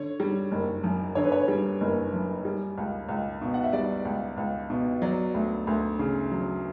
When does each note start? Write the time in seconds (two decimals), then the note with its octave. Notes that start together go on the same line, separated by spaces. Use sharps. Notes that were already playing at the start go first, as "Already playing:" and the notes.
Already playing: D3 C#5
0.20 G3
0.52 F#1
0.84 F#2
1.15 D3 C#5
1.24 B4
1.32 C#5
1.48 G3
1.81 F#1
2.13 F#2
2.45 G3
2.78 C#2
3.09 C#2
3.42 B2
3.54 F#5
3.64 E5
3.73 G3 D5
4.05 C#2
4.37 C#2
4.70 B2
5.02 F#3 D5
5.34 D2
5.67 D2
5.99 C#3
6.32 F#3